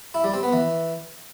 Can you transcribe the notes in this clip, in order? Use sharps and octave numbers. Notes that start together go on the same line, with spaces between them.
E4
G3
C4
B3
E3